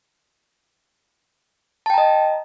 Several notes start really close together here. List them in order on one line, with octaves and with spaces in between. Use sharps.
A5 G5 A#5 D#5